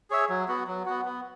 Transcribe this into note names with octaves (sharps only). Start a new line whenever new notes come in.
G#4 C#5 E5
F#3
B3 F#4
F#3
B3 F#4
B3